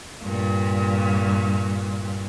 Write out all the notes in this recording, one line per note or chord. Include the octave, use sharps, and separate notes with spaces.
G2 A#2